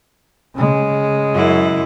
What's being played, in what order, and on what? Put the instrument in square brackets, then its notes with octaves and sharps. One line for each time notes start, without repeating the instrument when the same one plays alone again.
[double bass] C#3 G#3
[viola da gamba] F#2 E4